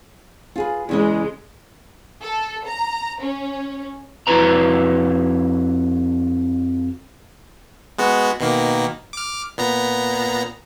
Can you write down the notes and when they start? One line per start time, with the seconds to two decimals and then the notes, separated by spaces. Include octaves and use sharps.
0.56 F4 G#4 B4
0.89 E2 C#3 G#3 D#5
2.22 A4
2.67 A#5
3.21 C#4
4.27 F2 E4 F#4 B4 A#5
7.98 G#3 B3 F#4
8.40 B2 D#3 A#3
9.13 D6 F6
9.58 A#2 B3 A#5